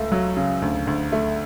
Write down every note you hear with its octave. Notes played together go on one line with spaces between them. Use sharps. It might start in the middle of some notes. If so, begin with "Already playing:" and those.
Already playing: C#2 A3
F#3
C#3
D2
D2
A3